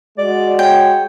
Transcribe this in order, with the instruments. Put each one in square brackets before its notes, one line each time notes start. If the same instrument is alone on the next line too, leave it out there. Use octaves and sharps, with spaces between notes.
[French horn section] G#3 F#4 [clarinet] D5
[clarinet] C#5 [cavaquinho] G5